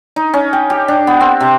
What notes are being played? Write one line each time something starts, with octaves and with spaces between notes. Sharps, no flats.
D#4
C#4
G5
G4
D4
B3
C4
C3